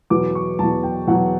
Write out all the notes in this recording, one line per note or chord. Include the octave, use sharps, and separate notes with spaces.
E2 B2 F#3 D6
C#6
E2 B2 F#3 A5
G5
E2 B2 F#3 F#5